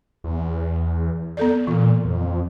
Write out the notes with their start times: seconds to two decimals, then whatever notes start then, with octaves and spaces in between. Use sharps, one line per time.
0.24 E2
1.37 B3 A4 D5
1.67 A#2 E3
2.05 F2